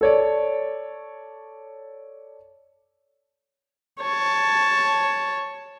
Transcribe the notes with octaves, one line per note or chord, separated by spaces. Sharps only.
A4 C#5 D5
C#5 A5